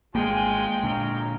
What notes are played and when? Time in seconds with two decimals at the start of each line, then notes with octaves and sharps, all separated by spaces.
0.15 G#1 G#3 A#3 D4 F4 G5 G#5
0.83 A#2 D3 C#5 F5 A#5